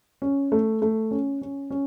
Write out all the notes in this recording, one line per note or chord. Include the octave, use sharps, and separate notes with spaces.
C#4
A3
A3
C#4
C#4
C#4